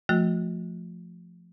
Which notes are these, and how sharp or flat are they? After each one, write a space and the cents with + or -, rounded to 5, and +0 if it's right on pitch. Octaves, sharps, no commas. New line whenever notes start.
F3 +0 A3 +0 F#4 -35